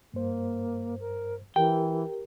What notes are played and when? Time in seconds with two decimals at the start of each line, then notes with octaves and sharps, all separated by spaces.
0.14 G2 A#3 C5
1.00 A#4
1.56 E3 G4 A#4 G5